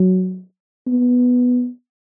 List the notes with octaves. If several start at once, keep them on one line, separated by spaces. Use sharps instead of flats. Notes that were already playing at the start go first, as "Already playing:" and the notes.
Already playing: F#3
B3